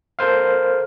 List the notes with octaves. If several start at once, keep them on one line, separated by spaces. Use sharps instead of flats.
A4 A#4 C5 F5